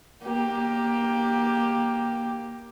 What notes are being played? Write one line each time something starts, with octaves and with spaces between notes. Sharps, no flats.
A#3 G4